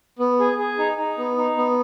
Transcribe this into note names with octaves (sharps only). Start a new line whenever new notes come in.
B3
G#4
G#4
D#4
D#4
B3
D#4
B3